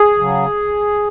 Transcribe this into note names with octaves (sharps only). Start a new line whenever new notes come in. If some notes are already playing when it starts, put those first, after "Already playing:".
Already playing: G#4
C#3 F#3